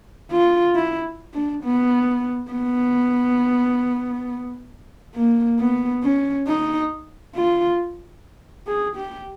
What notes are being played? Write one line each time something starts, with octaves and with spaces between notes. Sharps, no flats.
F4
E4
D4
B3
B3
A#3
B3
C#4
D#4
F4
G#4
G4